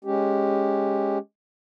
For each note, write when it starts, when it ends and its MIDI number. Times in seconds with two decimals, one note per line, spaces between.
0.04 1.18 56
0.04 1.18 61
0.04 1.18 67